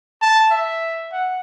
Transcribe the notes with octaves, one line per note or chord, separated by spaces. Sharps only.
A5
E5
F#5